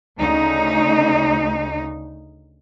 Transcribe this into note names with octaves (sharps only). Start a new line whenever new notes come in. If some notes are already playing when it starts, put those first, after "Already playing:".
D2 C#3 D#4